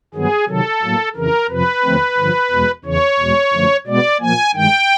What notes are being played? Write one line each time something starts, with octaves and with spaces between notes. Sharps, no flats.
G2 D#3 F#3 B3 G#4
C3 D#3 F#3 A4
A2 F#3 A#3
F2 C#3 E3 A#4
F2 C3 F3 B4
D#2 D3 F3 A3 C4
G2 D3 F3
E2 B2 G#3
E2 C#3 E3 C#5
E2 B2 G#3
F#2 D3 F3 A3
B2 G#3 B3 D5
A#2 F3 A#3 G#5
G2 D#3 G#3 G5